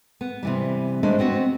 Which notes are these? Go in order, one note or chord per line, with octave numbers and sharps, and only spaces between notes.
B3
C3 E3 G3
G#3 A3 B3 D4 C5 D5
B3 C4 F#4